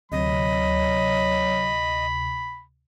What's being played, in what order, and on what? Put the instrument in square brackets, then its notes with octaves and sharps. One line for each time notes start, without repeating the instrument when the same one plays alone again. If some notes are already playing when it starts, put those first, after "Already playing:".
[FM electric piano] D2 C3 [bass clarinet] F#3 [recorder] D#5 [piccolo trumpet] B5